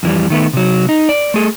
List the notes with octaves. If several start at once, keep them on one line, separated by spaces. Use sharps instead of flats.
F2 E3 G3
D#3 A3 B3
C3 F#3
D#4
D5
A3 G#4 A4